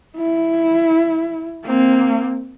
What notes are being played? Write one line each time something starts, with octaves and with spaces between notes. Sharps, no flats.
E4
A#3 C4